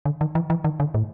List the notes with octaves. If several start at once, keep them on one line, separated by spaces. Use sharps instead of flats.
D3
D#3
E3
E3
D#3
D3
A2